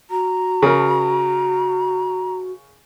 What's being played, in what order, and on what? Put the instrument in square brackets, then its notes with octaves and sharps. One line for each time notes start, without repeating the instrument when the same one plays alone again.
[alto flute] F#4 [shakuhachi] A#5
[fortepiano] C#3 A#4